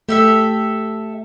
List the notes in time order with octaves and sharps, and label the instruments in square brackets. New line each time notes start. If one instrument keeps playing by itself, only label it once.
[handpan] A3 [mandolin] G4 A4 E5